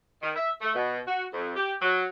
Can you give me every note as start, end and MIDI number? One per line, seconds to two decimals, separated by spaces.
0.22 0.31 51
0.36 0.51 76
0.61 0.72 57
0.75 0.99 47
1.07 1.25 66
1.33 1.51 41
1.56 1.73 67
1.82 2.05 54